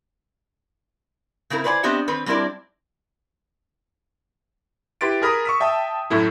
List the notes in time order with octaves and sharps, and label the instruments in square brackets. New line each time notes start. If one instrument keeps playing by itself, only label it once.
[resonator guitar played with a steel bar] C#3 C4 E4 A#4
B4 C5 D5 G5 G#5
B3 C4 D4 G4 D#5 E5
D#3 C4 B4
G3 C4 D4 E4 A#4 D5
[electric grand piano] E4 G4 B4 C6 A6 D7
G#4 A#4 B5 D#6
C#6 E6 B6
E5 G5 A5 D#6
F#2 A2 A3 E4